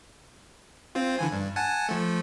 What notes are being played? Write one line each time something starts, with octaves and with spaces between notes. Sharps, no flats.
C4 F4
D3 E3 G#5
G2
F#5 G#5 A5
F3 A3